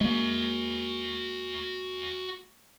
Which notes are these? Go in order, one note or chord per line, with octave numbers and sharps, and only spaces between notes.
G#3 A#3 F#4 E5